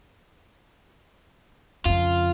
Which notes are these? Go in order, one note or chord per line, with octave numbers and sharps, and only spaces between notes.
F2 C#3 F4